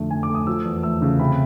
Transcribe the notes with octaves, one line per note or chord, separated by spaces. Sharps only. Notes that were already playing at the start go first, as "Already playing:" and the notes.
Already playing: F2 D3 A3
A3 G#5
D6
A3 D#6
F3 E6
E2
A3 E6
C#3
C3 B5